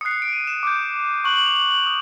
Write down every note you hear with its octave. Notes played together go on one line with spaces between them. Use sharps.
D#6 F#6 C7 C#7
C#7
D7
D#7
E7
D6 G6
C#6 F#6 F#7
F#7
F7
F#7
F#7
D#6